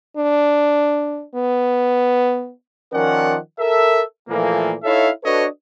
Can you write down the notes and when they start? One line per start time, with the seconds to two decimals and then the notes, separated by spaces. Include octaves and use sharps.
0.17 D4
1.35 B3
2.93 D#3 F3 C#4 A#4 D5 F#5
3.59 A4 A#4 E5
4.28 A#2 E3 F3 A3 A#3
4.84 D#4 E4 A4 C#5 E5 F5
5.24 D4 F#4 A4 B4 C#5 D#5